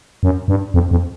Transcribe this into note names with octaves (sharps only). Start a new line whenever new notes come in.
F#2
G2
F2
F2